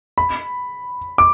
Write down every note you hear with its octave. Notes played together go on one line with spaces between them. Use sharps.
B5
D6